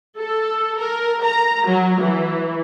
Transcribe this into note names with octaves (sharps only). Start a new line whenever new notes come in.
A4
A#4
A#5
F#3
E3